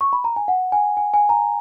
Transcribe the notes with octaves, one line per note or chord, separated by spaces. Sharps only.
C#6
B5
A#5
G#5
F#5
G#5
G#5
G#5
A#5